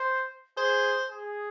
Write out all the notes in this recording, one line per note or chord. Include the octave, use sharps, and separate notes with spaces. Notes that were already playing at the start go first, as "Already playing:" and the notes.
Already playing: C5
G#4 C5
G#4